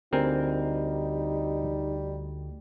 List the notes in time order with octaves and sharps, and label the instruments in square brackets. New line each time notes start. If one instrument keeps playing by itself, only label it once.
[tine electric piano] D2 [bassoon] G3 [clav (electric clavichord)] C4 A#4 G#5 [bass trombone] D#4